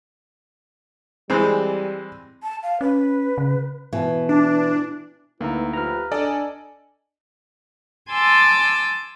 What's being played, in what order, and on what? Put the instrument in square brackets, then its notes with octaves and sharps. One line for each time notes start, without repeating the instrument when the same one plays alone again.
[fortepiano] E3 G#3 C4 [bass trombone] G3
[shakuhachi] A5
F5
[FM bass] C#4 [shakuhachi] B4
[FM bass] C#3
[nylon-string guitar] B2 E3
[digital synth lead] D4
[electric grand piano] D2 [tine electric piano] A#3 D#4 A#5 [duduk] E4 [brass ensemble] B4
[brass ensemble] F3 G4 [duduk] B4 [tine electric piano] A#5 F6
[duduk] D4 [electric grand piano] A4 D5 D#5 [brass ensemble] G#5
[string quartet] G#5 A5 C6 D6 E6